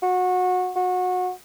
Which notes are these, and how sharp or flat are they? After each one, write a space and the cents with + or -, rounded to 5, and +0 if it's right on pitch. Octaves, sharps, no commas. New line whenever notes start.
F#4 -20
F#4 -25